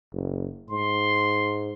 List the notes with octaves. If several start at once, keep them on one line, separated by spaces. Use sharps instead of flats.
F#1
G#2 C6